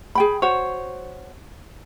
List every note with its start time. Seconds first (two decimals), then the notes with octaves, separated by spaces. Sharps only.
0.15 G#4 G5 B5
0.42 F#4 C5 C#5